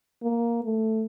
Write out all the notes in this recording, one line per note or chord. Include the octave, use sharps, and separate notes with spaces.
A#3
A3